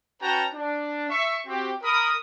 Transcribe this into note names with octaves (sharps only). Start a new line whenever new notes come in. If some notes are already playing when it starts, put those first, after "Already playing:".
C#4 F#4 B4 G5 A5 A#5
D4
E5 C#6
C4 F#4 G4
A#4 B5 D#6